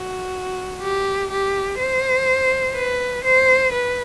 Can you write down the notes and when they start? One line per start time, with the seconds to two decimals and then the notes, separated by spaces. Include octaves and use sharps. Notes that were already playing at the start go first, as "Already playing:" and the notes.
Already playing: F#4
0.82 G4
1.31 G4
1.79 C5
2.75 B4
3.24 C5
3.72 B4